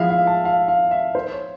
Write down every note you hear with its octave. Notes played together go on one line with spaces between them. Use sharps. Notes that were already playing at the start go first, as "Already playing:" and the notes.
Already playing: F3 G#3 B3 E4 E5 F5
F5
A5
F5
F5
E5
C5
C#5